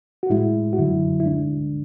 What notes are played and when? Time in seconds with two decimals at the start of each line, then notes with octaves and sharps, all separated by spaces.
0.23 F#4
0.30 A2 G#3 E4
0.73 F#4
0.78 F#2 D3 F#3 E4
1.20 E4
1.26 D2 D3 G#3 D4